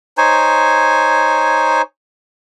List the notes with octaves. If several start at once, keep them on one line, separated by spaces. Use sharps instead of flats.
D#4 C5 C#5 G#5